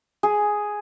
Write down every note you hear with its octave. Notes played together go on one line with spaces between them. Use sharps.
G#4